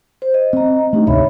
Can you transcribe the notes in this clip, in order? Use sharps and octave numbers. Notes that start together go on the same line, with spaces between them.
C5
D#5
C4 D#5 A#5
A3 D4 D#4 G4
G#1 D2 C3 C#5 E5 B5